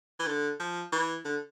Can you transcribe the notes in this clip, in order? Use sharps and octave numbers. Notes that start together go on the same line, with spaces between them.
E3
D3
F3
E3
D3